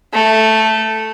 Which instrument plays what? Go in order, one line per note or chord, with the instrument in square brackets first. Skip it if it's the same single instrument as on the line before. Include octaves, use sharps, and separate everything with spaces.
[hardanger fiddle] A3